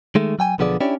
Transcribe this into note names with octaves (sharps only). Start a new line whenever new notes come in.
D#3 G#3 A3
F#3 G5 G#5
B1 D3 F3 B3 G#4 D5
C#4 D4 E4 G4 C#5 D5